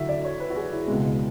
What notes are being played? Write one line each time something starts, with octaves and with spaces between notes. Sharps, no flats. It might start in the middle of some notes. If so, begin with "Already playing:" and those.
Already playing: D2 D3 F#3 E4 F#4 E5
D5
C#5
B4
F#4
G#4
E4
C#2 B2 G#3